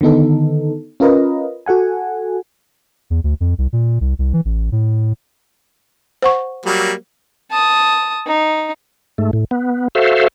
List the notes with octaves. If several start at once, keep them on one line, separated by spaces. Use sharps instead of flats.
D3 D#3 B3 D#4 A4
C#4 F4 A#4 B4 D#5
F#4 A4 F#5 G#5
E2
D2
F2
C2
A#2
C2
C2
E3
A1
A2
C5 F#5 C#6
F#3 G3 A#3
A5 D#6
D#4
G#2 A3
A2
B3
F#4 A4 C5 E5 F5